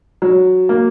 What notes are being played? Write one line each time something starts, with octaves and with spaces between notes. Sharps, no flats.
F#3
A#3